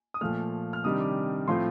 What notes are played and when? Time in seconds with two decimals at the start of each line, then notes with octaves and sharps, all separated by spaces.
0.14 D#6
0.21 A#2 F3 A3 F6
0.73 F6
0.84 C3 D#3 G3 D4 D#6
1.00 D6
1.48 A2 F3 C4 F4 C6